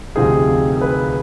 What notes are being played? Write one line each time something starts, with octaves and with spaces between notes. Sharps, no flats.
D2 C3 F3 C4 D#4 G#4
G#4
B4